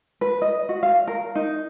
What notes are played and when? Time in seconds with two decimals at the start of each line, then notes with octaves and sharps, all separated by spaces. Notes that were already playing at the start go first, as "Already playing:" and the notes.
0.21 B4
0.42 D#5
0.69 F#4
0.83 F5
1.08 A#4
1.35 D#4